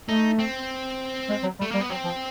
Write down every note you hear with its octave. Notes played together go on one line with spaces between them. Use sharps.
A3 D#4
C4
G#3
F#3
G3 A3
G3 A#3
B3
F#3 C4
F3